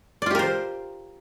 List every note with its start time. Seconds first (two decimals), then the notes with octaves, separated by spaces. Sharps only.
0.22 D5
0.26 F4
0.31 G4
0.35 A#4
0.39 C5